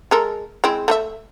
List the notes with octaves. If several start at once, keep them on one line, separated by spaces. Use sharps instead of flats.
G#3 A4 A#4
G#3 C4 E4
A3 A4 E5